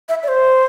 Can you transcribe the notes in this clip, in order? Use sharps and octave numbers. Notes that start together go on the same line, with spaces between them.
E5
D5
C5